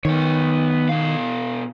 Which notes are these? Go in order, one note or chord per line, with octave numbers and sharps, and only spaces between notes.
D#3 B3 C#5
B2 F5